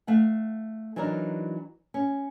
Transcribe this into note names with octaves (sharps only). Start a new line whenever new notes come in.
A3 F5 F#5
E3 F#3 D4 D#4 A#4
C#4